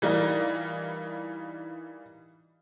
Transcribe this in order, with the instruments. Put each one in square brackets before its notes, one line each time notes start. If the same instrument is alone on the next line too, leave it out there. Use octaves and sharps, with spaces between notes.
[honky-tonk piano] E3 G3 D#4 F4 A#4